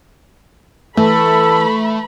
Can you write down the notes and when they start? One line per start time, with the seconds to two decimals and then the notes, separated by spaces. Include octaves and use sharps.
0.97 E3 A3 A4 B5